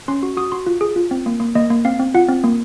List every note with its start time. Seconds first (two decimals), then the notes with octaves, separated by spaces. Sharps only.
0.08 C#4 C6
0.23 F#4
0.37 F#4 D#6
0.52 F#4 C6
0.66 F4
0.81 G#4
0.96 F4
1.11 C4
1.26 A#3
1.40 A#3
1.55 A#3 D#5
1.70 A#3
1.85 C4 F5
1.99 C4
2.14 F4 F#5
2.28 C4
2.44 A#3